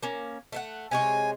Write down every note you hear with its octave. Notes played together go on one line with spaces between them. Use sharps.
A#3 C#4
A3 E5 F#5
C3 G#3 C#5 G#5